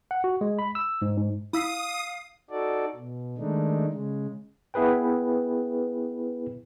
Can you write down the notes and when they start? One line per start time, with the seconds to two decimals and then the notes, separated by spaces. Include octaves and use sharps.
0.11 F#5
0.24 F#4
0.41 G#3
0.59 B5
0.75 E6
1.02 G#2
1.17 G#2
1.53 E4 F5 D#6 E6 B6
2.50 D#4 F#4 A4 D5
2.96 B2
3.38 D#3 G#3 A3 D4 D#4
3.92 C#3 G#3
4.74 B3 E4 G#4 B4 G5